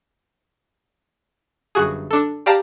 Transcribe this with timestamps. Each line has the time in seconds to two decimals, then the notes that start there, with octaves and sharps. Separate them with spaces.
1.75 G1 F#2 F#4 G#4
2.11 D4 A4
2.46 G4 D5 F5 A5 A#5